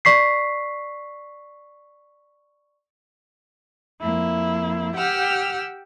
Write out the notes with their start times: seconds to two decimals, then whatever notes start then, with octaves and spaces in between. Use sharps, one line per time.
0.05 D5 C#6 B6 C7
4.01 F2 A#3 E4
4.95 G4 F#5 G5 E6 F6